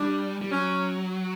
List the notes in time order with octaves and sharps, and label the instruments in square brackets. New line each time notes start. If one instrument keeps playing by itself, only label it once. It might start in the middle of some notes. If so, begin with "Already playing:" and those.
Already playing: [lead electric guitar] G3 [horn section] D4
[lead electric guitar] G3
[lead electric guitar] F#3 [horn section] C#4